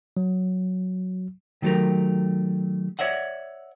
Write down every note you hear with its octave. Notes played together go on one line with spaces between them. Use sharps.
F#3
D#3 F#3 A3 G4 A#4
C#5 D5 E5 F#5